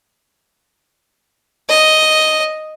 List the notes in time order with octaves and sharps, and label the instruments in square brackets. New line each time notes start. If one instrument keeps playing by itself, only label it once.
[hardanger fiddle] D#5